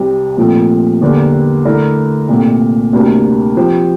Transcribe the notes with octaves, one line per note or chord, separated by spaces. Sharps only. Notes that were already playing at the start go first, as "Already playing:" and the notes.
Already playing: C2 C3 G3 C4
A#2 F3 A3 C4
E2 D3 G3 A#3
D3 A3 E4 A#4 D5
C2 A#2 A3 C4
D2 C3 G3 A#3 D4
F3 C4 G4 C5